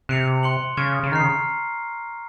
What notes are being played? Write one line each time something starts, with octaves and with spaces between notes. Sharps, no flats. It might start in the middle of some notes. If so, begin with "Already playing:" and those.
C3 F#6 C#7 F7
C6 F#6 C#7 F#7
C#3 C#6 F6 G#6
C#3
D#3 A#5 F6 C7
C#3